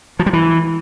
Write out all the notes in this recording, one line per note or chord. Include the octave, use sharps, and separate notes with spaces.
F3
G3
E3